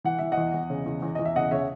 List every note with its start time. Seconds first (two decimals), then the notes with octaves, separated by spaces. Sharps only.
0.04 E3 F#5
0.19 E3 E5
0.32 D#5 F#5
0.37 E2
0.54 E2
0.70 C#3
0.86 E2
1.02 E2
1.15 E2 D#5
1.25 E5
1.36 C#3 D#5 F#5
1.51 C#3 C#5 E5